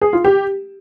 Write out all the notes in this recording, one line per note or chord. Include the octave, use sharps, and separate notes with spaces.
G#4
F4
G4